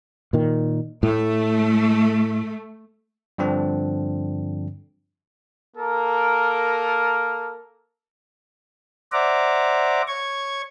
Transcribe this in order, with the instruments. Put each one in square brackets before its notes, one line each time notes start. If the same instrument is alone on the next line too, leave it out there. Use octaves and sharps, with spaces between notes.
[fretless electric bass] A#2 D#3
[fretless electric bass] A2 [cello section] A3
[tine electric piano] G2 D3 F3 C4 D4
[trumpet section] A#3 A4 A#4
[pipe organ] C5 D5 E5 F#5 A#5 D6
C#5 C#6 G#6